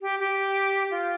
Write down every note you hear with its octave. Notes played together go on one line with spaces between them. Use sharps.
G4
G4
F4